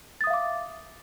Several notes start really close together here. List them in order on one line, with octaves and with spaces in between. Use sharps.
A6 D#6 E5 F5 D6